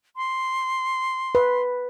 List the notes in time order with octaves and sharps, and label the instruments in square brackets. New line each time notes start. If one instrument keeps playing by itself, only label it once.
[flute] C6
[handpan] B4